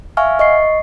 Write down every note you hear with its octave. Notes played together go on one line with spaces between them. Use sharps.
E5 F5 G#5 C#6 F6
D#5 C#6 C7